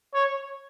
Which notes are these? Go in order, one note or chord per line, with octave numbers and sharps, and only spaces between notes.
C#5